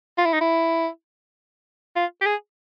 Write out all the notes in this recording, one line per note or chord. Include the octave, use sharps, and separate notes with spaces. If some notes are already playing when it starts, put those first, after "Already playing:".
F4
E4
D#4
E4
F4
G4
G#4